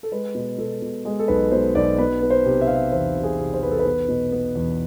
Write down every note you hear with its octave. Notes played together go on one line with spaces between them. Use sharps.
A4
G#3 B4
B2
B2 A4
B2
G#3 G#4
A4
B1 B4
B2 C5
B1 D5
B3 B4
B3
C5
C3
E5
C3 F5
E5
E2 C5
C3
G#4
C3
C5
E2 B4
A4
B4
B3
B2
B3
E2